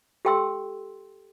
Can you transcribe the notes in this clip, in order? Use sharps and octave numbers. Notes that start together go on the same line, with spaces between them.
G4 A4 G5 C6 E6